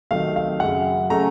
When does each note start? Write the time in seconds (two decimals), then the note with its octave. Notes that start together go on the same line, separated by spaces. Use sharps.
0.11 C3 D#3 F#3 A3 F5
0.36 F5
0.60 F#2 C#3 F#3 F#5
1.10 C#3 A3 C#4 A#5